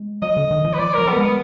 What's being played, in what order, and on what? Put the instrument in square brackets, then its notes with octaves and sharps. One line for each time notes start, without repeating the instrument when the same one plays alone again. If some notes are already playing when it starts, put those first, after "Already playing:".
Already playing: [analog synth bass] G#3
[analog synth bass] F#3 [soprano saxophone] D#5
[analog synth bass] D3
D#3
F3
[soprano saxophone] B4
[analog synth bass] F3 [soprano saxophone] D5
[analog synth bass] F#3 [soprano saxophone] A#4
[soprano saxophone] B3
[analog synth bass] G#3
[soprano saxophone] B3